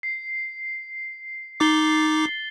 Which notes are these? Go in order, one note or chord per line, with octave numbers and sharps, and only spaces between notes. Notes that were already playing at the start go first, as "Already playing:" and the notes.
C7
D#4 D6 A6 C7 G7